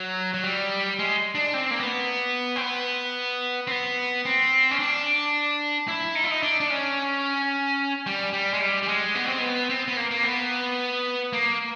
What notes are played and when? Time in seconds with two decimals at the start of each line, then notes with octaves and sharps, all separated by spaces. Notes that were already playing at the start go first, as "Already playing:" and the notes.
Already playing: F#3
0.34 F#3
0.44 G3
0.99 G#3
1.35 D4
1.54 C4
1.71 A#3
1.80 B3
2.56 C4
2.61 B3
3.67 C4
3.71 B3
4.25 C4
4.71 C#4
4.79 D4
5.88 E4
6.15 D#4
6.24 E4
6.31 D#4
6.43 D4
6.60 D4
6.70 C#4
8.06 G3
8.33 G3
8.53 G#3
8.61 G3
8.83 G3
8.88 G#3
9.15 B3
9.26 C4
9.39 B3
9.69 C4
9.88 B3
9.97 A#3
10.11 A#3
10.23 B3
11.33 A#3